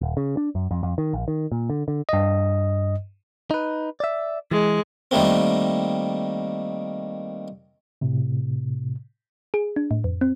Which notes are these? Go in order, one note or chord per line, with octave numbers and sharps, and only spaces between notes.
D#1
C#3
D4
F#2
F2
F2
D#3
A#1
D#3
A#2
D3
D3
G2 D#5
D#4 B4
D5 E5
E3 G#3
D#3 G3 A3 A#3 C4
A2 C3
G#4
D4
A2
F2
C4